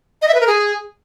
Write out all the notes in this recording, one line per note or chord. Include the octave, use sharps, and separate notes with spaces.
D#5
E5
B4
A#4
G#4